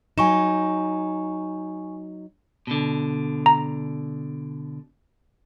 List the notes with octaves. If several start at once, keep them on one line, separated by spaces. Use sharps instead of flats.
F#3 D#4 G#5 C#6 E7
B2 D3
A#5